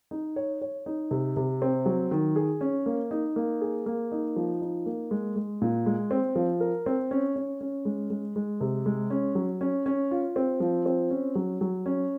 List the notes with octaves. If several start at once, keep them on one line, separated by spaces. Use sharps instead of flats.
D#4
C#5
C#5
D#4
C3
C3
C4
F#3
D#3
G#4
C#4
A#3
D#4
A#3
G#4
A#3
D#4
F3
D#4
A#3
G#3
G#3
A#2
G#3
C4
F3
A#4
C4
C#4
C#4
C#4
G#3
G#3
G#3
C3
G#3
C#4
F#3
C#4
C#4
F4
C4
F3
C4
C#4
F#3
F#3
C#4